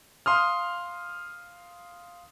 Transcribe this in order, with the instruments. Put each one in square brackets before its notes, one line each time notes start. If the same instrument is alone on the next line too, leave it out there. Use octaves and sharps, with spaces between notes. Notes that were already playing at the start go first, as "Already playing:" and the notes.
[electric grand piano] F5 C6 D#6 F6